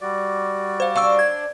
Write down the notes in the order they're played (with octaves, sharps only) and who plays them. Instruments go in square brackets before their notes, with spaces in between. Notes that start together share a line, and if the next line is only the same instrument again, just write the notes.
[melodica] G3 F#4 D5
[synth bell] C5 F5
[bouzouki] D4 C5 [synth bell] F5 C#6 E6
[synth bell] G#6